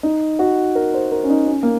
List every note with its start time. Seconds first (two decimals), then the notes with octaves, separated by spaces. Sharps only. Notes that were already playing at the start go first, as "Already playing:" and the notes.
0.03 D#4
0.39 F#4
0.75 A#4
0.93 C5
1.12 A#4
1.23 C#4
1.30 D#4
1.47 C#4
1.63 A#3